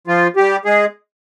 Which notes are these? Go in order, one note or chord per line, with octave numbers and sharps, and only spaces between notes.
F3 F4
G3 G4
G#3 G#4